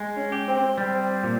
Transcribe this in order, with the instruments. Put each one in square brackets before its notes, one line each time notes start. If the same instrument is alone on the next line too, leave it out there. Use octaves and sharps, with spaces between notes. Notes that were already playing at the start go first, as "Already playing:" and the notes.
Already playing: [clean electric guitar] G#3
[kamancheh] C#4
[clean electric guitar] G4
[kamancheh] C4
[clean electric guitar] G3 [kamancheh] C4
[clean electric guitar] A#2